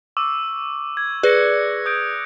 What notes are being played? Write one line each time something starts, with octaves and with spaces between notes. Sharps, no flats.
C#6 D6 E6
G#6
G#4 B4 D5 F#6 A#6 C#7
D#6 G6 D7